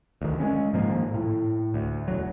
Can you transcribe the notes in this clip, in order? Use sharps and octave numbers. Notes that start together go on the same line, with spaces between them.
D2 D#3
G#3 C#4
G#2 D#3 F3 A#3
A2
D2
E1 F#3